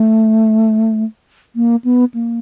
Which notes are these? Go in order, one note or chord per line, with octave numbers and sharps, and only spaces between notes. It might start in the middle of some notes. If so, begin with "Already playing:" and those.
Already playing: A3
A#3
B3
A#3